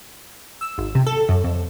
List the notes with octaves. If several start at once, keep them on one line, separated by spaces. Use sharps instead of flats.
E6
G#1
C3
A4
F#2
F2